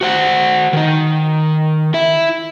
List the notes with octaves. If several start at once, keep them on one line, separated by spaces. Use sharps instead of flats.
F#4 C5 F#5
D#3 D#4
E4 E5